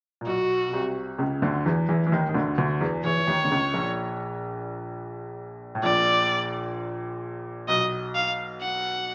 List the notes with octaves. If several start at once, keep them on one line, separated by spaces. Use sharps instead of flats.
A#2
B1 B2 F#4
B2
C2 C3
C#2 C#3
D2 D3
E2 E3
E2 E3
E3
D#2 D#3
D#3
D2 D3
D2 D3
E2 E3
E2 E3 C#5
E3
D#2 D#3
D3
C#2 C#3
A#1 A#2
A2
A#1 A#2 D5
B1 B2 D#5
F5
F#5